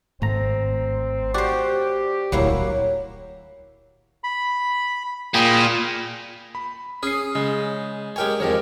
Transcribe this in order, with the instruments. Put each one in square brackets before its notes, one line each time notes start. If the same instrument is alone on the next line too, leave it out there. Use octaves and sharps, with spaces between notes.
[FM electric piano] G#1 A#5 [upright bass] A3 [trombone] C4
[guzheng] F#4 C5 [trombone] G4 [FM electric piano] D5
[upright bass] D1 C2 [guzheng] F#3 A#3 E4
[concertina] B5
[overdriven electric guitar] A#2 [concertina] G#4 G5 B5
[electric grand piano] B5
[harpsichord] C#4 G#4 [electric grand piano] D#6 C7
[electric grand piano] C#3 [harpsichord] G#3
[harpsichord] G#3 A#4 C#5 [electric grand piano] G4 G5 G#5
[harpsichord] F2 G#2 D#3 [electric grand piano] G4 A#4 C#5